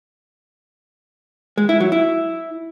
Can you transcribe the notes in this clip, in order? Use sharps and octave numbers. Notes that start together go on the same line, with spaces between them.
G#3
E4
F#3
E4